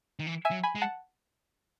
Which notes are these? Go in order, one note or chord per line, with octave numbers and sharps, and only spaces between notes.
D#3
E3
E5 G#5
F#3
G#5 B5
G#3
F#5 A5